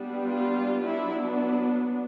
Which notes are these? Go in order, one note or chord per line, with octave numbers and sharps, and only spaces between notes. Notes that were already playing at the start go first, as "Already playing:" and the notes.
Already playing: G3 B3 D4
F4
F#3 B3 D4 E4